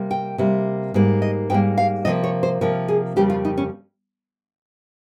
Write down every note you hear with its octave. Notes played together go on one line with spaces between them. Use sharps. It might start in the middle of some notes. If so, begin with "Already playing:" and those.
Already playing: C3 G3 A#3
G5
C3 G3 A#3
G#2 G3 A#3
D#5
G#2 G3 A#3 G5
F5
C3 F3 A#3 D#5
C#5
C5
C3 F3 A#3 A#4
G#4
F2 C#3 G3 A#3 G4
F4
D#4
C#4